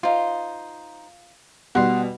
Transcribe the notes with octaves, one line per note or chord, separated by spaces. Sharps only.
D#4 F4 C5
B2 G3 F#5 C6